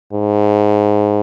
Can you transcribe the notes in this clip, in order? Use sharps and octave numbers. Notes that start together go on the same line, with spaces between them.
G#2